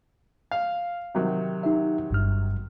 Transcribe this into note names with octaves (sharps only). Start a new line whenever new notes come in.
F5
C3 D#3 F#3
D#4 G4 E5
G1 G2 F6